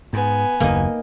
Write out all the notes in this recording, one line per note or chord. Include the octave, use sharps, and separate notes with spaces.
G#2 B3 G#5
F#1 D#2 A#3 D#4